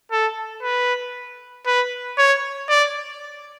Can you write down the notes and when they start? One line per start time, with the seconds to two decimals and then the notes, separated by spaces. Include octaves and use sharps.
0.12 A4
0.63 B4
1.66 B4
2.18 C#5
2.69 D5